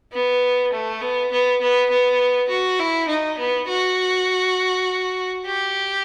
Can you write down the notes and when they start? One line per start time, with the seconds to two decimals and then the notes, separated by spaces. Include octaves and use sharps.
0.12 B3
0.72 A3
1.01 B3
1.31 B3
1.61 B3
1.90 B3
2.49 F#4
2.79 E4
3.08 D#4
3.38 B3
3.68 F#4
5.46 G4